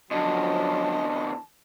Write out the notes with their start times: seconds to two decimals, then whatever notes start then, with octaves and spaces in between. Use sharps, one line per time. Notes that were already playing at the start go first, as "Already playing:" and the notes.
0.11 E2 D3 F3 F#3 D#5 A5